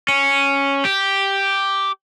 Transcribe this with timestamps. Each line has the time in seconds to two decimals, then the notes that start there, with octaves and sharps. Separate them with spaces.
0.08 C#4
0.85 G4